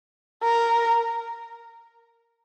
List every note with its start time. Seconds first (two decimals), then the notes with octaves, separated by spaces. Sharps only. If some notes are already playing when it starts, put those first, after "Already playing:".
0.43 A#4